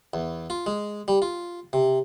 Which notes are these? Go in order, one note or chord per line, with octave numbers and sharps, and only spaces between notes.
E2
F4
G#3
G3
F4
C3